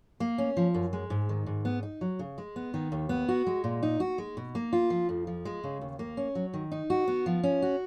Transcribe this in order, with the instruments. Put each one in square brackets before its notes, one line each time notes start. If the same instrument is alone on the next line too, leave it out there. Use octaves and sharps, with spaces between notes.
[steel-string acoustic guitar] A#3
C#4
F3
F#2
G#3
G#2
D#3
G#2
B3
D#4
F#3
C#3
G#3
B3
D#3
D#2
B3
F#4
G#3
A#2
D#4
F#4
G#3
B2
A#3
F4
F3
F2
F3
G#3
C#3
D#2
A#3
C#4
F#3
D#3
D#4
F#4
B3
F3
C#4
F#4